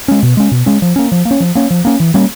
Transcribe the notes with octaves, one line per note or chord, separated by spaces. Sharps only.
G#3 C#4
B2
G#3 C#4
B2
G#3 C#4
F3
A#3 C#4
F3
A#3
C#4
F3
A#3 C#4
F3
A#3 C#4
E3
G3 A#3 C#4